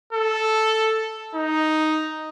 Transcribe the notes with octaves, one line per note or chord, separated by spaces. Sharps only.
A4
D#4